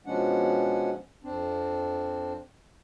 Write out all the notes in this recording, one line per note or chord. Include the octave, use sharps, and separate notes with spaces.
B2 F3 G#3 C#4 D4 F#5
F2 C4 D4